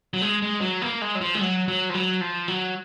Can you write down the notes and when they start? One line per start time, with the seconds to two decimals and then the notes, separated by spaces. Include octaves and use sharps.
0.14 F#3
0.22 G#3
0.42 G#3
0.61 F#3
0.82 A#3
1.02 G#3
1.15 F#3
1.21 F3
1.35 G#3
1.41 F#3
1.68 F#3
1.90 F3
1.94 F#3
2.21 F3
2.48 F#3